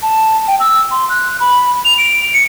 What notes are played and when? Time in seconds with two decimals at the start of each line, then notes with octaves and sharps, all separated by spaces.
0.02 A5
0.48 G5
0.60 E6
0.91 C6
1.10 F#6
1.40 B5
1.85 F7
1.98 D7
2.34 C#7